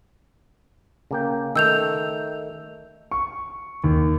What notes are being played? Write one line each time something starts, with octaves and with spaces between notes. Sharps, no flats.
C#3 A#3 G5
D#3 A3 E6 G6 F7
C#6
D#2